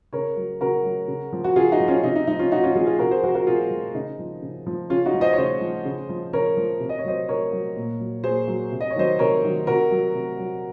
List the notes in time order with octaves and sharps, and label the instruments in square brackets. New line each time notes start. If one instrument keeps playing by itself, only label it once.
[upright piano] C#3 A#4 C#5
F#3
C#3 F#4 A#4
F#3
C#3
F3
F#4
C#3 F4 G#4
D#4 F#4
F3
C#4 F4
C3 D#4
D#4
F3 D#4
C#4 F4
C3 D#4 F#4
C#4 F4
F3 F4 G#4
F4 G#4
C3 F#4 A#4
G#4 C5
F3 F#4 A#4
F#4 A#4
C3 F4 G#4
F3
C#3 D#4
F3
C#3
F3
C#3 C#4 F4
D#4 F#4
F3
C5 D#5
C#5
C#3 C5 D#5
F3
C#3
F3
C#3 A#4 C#5
F3
C3
D#5
C#5
F#3 C5 D#5
C3 A#4 C#5
F#3
A#2
F#3
A#2 G#4 C5
F#3
C3
D#5
C#5
D#3 F#3 C5 D#5
C3 A#4 C#5
D#3 F#3
C3 F#4 A#4
F#3
C3
F#3